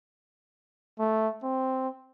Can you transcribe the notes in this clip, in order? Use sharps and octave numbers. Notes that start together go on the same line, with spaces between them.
A3
C4